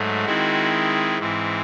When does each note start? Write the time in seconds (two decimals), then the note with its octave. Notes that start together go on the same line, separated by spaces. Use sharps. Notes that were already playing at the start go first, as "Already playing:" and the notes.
Already playing: G#2 F#3 A3
0.25 D#3 G#3 C4 E4 F#4
1.19 G#2 E3 C4 E4